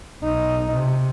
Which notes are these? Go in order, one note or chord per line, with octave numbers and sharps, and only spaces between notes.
B1 D#4
C3